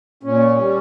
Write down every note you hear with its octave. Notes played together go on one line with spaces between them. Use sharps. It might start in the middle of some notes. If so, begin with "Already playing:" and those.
A#2 C#4
G3